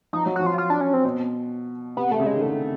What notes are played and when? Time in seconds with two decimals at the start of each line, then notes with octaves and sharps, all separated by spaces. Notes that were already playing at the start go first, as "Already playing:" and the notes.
0.13 F3 D#4
0.26 F#3
0.36 F3 F#4
0.46 F4
0.58 F4
0.70 D4
0.81 C#4
0.94 C4
1.05 B2
1.97 C3 B3
2.11 C3 A3
2.20 C#3
2.26 G#3
2.35 D#3
2.42 D3 A3